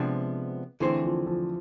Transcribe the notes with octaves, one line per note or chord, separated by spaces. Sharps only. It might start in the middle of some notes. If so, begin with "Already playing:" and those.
Already playing: C3 F3 G#3 B3 D4
D3 E3 A3 C4 G#4 C5
F3
F3